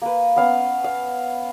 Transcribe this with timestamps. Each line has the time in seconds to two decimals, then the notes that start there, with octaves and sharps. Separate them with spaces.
0.02 A#3 B4
0.36 B3 C#4 F5 F#5
0.84 F5